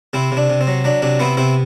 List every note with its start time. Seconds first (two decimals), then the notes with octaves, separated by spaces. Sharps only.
0.13 C3 C4 E4
0.32 C3
0.37 D4
0.50 C3
0.61 C4
0.67 F#3
0.84 F#3 D4
1.02 C3 D4
1.19 B3 C4 E4
1.37 C3 C4 E4